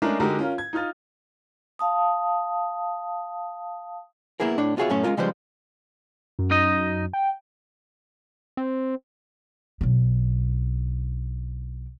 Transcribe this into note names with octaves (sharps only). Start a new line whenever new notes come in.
G#3 A3 C#4 D4 G#4 A#4
D3 G#3 D#4 F#4 G4 A#4
C#4 F4 A#4
G#6
D#4 F4 D#6 F6 A6
F5 A5 D#6
A#3 B3 E4 G#4 A#4
A2 D4 C#5
B3 F4 F#4 G#4 C#5 E5
F#2 A2 A3 C#4 C#5
G#3 C#4 D#4 F4 A#4
C#3 F3 G3 G#3 B4 C5
F#2
D#4 D#5
G5
C4
B1 D4